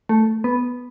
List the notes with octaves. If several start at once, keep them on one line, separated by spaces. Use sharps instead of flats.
A3
B3